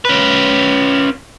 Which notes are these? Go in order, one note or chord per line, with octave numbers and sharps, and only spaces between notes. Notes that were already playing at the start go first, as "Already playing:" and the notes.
C#4 B4